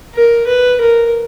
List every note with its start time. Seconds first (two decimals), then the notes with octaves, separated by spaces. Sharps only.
0.15 A#4
0.47 B4
0.81 A#4